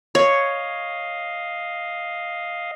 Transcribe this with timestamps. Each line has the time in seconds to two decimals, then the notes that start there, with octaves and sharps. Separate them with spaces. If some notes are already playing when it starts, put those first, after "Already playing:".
0.15 C#5 D#5 F5